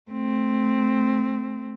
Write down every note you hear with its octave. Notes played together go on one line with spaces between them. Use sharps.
A3 C4